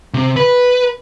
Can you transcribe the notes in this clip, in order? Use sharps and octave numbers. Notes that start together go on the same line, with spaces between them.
C3
B4